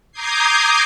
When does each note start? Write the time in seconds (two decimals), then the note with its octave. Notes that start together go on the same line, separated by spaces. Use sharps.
0.12 A#5 D6 D#6 G6 G#6 C7